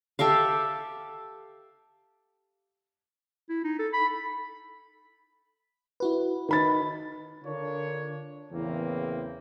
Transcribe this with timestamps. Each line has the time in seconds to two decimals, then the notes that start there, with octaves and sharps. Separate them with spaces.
0.19 G4 A4 E5 F5
3.49 E4
3.64 D#4
3.79 A4
3.93 B5
6.00 E4 F#4 B4
6.49 D#3 B5 A6
7.44 D3 D4 F4 A#4 C#5
8.51 E2 A2 C#3 E3 A#3 C4